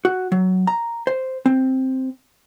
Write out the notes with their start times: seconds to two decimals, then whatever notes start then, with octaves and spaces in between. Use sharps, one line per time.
0.05 F#4
0.32 F#3
0.67 A#5
1.07 C5
1.46 C4